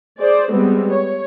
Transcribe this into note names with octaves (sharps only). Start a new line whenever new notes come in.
G#4 C5 D5
G3 G#3 B3 C4
C#5